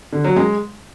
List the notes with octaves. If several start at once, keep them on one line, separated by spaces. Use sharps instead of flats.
D3
F#3
G#3